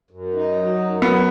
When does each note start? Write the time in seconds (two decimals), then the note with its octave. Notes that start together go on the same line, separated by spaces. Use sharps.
0.11 F#2
0.34 D#4
0.56 F#3
0.79 F#2
1.02 F#3 B3